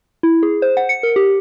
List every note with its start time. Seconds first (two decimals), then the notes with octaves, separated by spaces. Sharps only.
0.23 E4
0.43 G#4
0.62 C5
0.77 F#5
0.89 C#7
1.03 A#4
1.16 G4